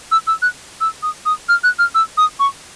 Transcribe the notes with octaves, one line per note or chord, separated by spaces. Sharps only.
E6
E6
F#6
E6
D#6
D#6
F6
F#6
F6
E6
D#6
C#6